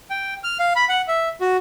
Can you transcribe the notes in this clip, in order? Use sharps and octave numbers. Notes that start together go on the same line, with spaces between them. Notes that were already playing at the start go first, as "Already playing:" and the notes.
G5
F6
F5
B5
F#5
E5
F#4